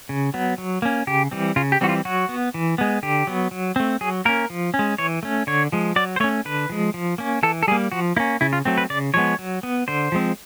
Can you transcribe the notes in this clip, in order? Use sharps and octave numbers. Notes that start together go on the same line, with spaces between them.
C#3
F#3 B3
F#3
A#3 C#4
C#3 G4
E3 G3 C4
C#3 F4
G4
E3 G3 C4 F#4
F4
F#3 F#4
B3
E3
G#3 B3
D3 G4
F#3 B3
F#3
A3 C4
F#3 G#4
A#3 C#4 A#4
F3
C#4
G#3
E3 C#5
A3 C#4
D3 C#5
F3 G#3
F#3 D5
C5
A3 C#4 C#5
D3 B4
F3 G#3
F3
A#3 C#4
E3 A4
A4
G3 A#3 G#4
F3 F#4
A#3 C#4 E4
C#3 E4
F4
F#3 A3 C4
B4
C#3 D5
F3 G#3 B3 C#5
F#3
B3
D3 C5
F3 G#3 C4